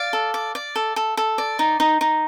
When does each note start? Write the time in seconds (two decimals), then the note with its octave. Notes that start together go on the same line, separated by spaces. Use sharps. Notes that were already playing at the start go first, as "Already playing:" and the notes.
Already playing: D5 F5
0.13 A4
0.34 D5
0.55 D5
0.76 A4
0.96 A4
1.17 A4
1.38 D5
1.59 D#4
1.80 D#4
2.01 D#4